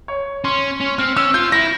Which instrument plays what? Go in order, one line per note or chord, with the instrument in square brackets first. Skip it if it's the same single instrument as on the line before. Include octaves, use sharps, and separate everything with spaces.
[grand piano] C#5
[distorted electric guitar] C#4 [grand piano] C6
[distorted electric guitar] C#4
[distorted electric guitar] C4 [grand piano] F6
[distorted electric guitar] C#4 [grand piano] E6
[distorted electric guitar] F4 [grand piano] G6
[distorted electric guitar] E4 [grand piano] A#6